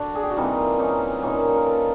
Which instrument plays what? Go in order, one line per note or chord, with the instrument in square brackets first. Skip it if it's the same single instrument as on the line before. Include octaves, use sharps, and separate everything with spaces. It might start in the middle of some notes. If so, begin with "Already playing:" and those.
Already playing: [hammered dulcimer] D3 D4 F#4
G#4
G4
F#4
C3 E3 G3 A#3 D#4 F4
C#4 D#4
A#2 G3 A#3 C#4 D#4 F4
A#4
A4 B4